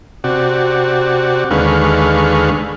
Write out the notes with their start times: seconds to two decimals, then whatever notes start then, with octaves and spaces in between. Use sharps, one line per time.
0.24 C3 F#4 D5
1.51 D#2 D3 G#3 B4 F5 C#6